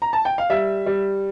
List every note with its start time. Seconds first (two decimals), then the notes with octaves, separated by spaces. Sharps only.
0.02 A#5
0.13 A5
0.25 G5
0.38 F5
0.50 G3 E5
0.86 G3